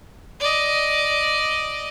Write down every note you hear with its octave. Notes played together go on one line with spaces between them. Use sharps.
D5 D#5